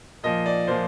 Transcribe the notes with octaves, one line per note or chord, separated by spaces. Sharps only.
A#2 F3 D#5
D5
A#2 F3 C5